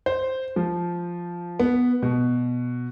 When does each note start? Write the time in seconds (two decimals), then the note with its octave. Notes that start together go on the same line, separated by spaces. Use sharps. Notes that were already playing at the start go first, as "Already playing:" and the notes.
0.06 C5
0.56 F3
1.59 B3
2.03 B2